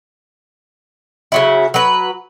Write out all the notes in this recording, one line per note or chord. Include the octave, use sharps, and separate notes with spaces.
C#3 F#3 E4
F#3 B4